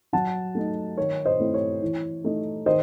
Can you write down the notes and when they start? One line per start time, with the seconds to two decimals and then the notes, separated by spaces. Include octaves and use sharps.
0.13 F#3 F#5 A5
0.55 A3 D#4
0.97 D#3 C#5
1.25 C5 D#5
1.39 A3 C4 E4
1.54 C#5
1.82 E3
2.24 A3 D#4
2.66 D#3 C5 D#5